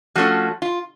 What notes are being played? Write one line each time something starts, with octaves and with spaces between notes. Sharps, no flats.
F3 A3 C#4 F#4
F4